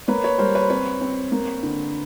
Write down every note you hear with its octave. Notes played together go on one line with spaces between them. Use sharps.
A#3 B4 C#5
B4 C#5
G3 A#4 C5
B4 C#5
C4 B4 C#5
C4
A#3
D3